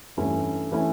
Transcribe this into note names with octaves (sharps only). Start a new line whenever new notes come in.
G2 E3 A3 C#4 E4
E3 A3 C#4 E4